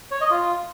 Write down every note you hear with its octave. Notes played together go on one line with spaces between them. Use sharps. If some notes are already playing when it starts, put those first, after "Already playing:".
C#5
D#5
F4